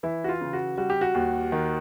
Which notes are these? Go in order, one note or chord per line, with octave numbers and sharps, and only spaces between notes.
E3 E4
F#4
F4
C#3
F#4
G3 F#4
G4
F#4
D#2
D#3